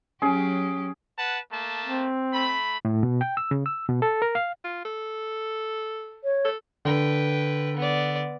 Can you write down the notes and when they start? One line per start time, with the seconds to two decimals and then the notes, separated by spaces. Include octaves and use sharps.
0.22 F#3 C#4 G4 G#4
1.17 B4 F#5 A5
1.51 A3 A#3 A5
1.85 C4
2.32 A3 B5
2.85 A2
3.03 B2
3.21 G5
3.37 E6
3.51 C#3
3.66 E6
3.89 B2
4.02 A4
4.22 A#4
4.35 F5
4.64 F4
4.85 A4
6.24 C#5
6.45 A4
6.85 D3 B4 G5
7.77 B3 D5